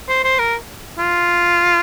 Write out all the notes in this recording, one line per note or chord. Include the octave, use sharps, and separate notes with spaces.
C5
C5
A#4
F4